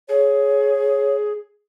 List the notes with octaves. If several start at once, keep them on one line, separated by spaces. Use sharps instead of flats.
G#4 C#5